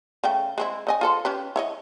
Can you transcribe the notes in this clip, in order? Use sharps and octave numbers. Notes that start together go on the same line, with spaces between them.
C#3 A3 G5
G#3 C4 E4
C#3 D#5 G#5
F4 A4 C5
C#4 G4 B4
E4 C#5 D#5